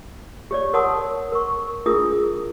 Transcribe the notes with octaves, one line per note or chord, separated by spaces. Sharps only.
G4 C#5 D5
A#4 C#5 F#5 A5 C6 D#6
A#4 C#6
D4 E4 F4 G#4 A#4 D#6